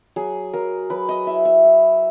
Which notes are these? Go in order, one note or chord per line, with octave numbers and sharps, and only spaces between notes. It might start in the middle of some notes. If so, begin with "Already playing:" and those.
F#3 G#4
F#3 A#4
F#3 B4
D#5
E4 E5
E5
E4